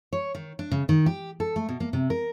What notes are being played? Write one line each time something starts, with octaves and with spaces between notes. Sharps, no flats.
C#5
D#3
D4
C#3
D#3
G4
A4
A3
B2
A#3
C3
A#4